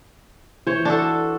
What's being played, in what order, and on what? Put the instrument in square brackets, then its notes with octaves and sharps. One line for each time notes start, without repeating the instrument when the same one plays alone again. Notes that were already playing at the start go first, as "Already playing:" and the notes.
[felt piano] E3 [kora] C5 C#5
[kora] D4 F#4 A4